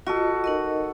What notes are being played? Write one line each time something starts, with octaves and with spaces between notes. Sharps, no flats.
F4 F#4 A4 D#5
D#4 A#4 D#5